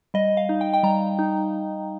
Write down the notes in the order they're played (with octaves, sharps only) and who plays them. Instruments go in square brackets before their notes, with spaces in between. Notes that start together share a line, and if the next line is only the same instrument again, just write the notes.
[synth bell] G3 D#5
F5
D#4
G5
G5
G3 A#5
D#4